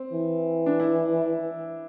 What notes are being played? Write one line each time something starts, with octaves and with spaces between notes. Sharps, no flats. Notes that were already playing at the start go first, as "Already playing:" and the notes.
Already playing: C4
E3
D4
E4